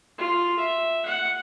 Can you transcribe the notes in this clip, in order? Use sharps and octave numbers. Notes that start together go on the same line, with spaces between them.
F4
E5
F#5